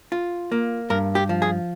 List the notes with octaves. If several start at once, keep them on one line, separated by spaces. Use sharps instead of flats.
F4
A#3
G2 A#4
G4
F3
G#4